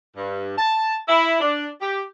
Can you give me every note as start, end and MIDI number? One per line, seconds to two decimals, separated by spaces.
0.17 0.52 43
0.57 0.95 81
1.08 1.39 64
1.40 1.66 62
1.80 2.00 67